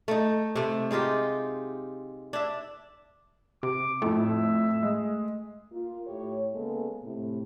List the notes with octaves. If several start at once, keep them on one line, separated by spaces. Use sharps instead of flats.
A3 D#4
C3 A3
G#3 D#4 F4 G4
D4 E5
C3 D6
F2 A2 A3 E5
G#3
A#3 F4
A2 G4 C#5
C#3 G#3 A#3 B3 A4
A2 C3